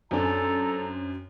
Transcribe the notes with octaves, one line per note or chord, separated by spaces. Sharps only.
F#2 C4 D4 A4 A#5